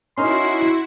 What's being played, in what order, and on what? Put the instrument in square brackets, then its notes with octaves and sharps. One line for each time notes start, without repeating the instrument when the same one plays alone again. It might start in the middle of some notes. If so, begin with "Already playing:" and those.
[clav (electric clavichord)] C#4 D#4 A#4 [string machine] E4 F#4 [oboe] C6